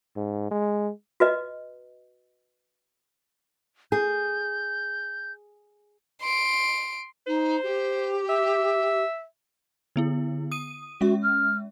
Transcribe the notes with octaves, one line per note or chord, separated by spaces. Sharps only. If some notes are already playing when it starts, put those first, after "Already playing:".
G#2
G#3
F#4 B4 D#5
G#4 G6
C6 D7
D#4 C5
G4
E5
D3 B3 E4
D#6 D#7
G#3 C#4 F#4 E5
F6